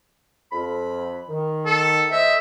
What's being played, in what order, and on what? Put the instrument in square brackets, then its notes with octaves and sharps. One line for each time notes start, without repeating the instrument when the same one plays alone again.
[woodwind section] F2 B5
D#3
[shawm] A4
[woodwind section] A3 C5 D#5 [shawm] E5